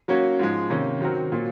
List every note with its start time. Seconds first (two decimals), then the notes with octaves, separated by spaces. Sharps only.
0.08 F#3 A#3 C#4 F#4
0.39 G#2 F3 G#3
0.70 C3 D#3 A#3 C#4
1.01 D#3 F#3 C4 F#4 A#4
1.32 A#2 F#3 A#3 F4